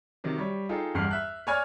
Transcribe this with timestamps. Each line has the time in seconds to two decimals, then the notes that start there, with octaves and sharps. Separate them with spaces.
0.24 C3 D#3 F#3
0.38 G3 C#5
0.69 D#4 F4 G#4 A4 G5
0.94 G1 E2 G2 F#5 F6 C7
1.11 E5 F#6
1.47 C#5 D5 G#5 F6 G#6